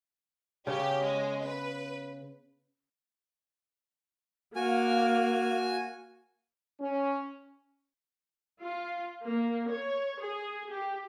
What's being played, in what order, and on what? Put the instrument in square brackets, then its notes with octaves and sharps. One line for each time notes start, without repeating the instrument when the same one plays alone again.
[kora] C#3 B3 C#4 [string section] G4
[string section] G#3
B4
[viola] A#3 F5 [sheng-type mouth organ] F#4 G#5
[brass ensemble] C#4
[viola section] F4
A#3
C#5
G#4
G4